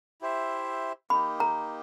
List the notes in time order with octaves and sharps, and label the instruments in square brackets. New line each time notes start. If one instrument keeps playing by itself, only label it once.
[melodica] E4 G4 C5 E5
[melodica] A#3 D#4 G4 [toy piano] B5
[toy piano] A#5